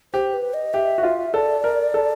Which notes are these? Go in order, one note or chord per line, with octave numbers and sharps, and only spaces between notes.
G4 C5
B4
D#5
G4 E5
F#4
F4
A4 D5
A#4
A4